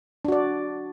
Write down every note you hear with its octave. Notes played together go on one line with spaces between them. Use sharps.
D4 F#4 D5